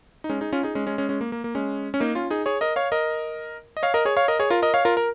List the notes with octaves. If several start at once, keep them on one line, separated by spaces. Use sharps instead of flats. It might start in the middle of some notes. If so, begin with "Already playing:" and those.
D#4
G#3 C#4
D#4 G#4
C#4 F4
D#4 G#4
G#3 C#4
G#3 C#4
G#3 C#4
G#3 C#4
A#3
A#3
A#3
G#3 C#4
C#4
A#3 D#4
C#4 F4
D#4 G#4
G#4 C#5
A#4 D#5
C#5 F5
A#4 D#5
D#5
C#5 F5
A#4 D#5
G#4 C#5
C#5 F5
A#4 D#5
G#4 C#5
F4 A#4
A#4 D#5
C#5 F5
F4 A#4
A#4